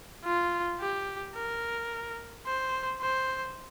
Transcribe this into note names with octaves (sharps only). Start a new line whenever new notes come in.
F4
G4
A#4
C5
C5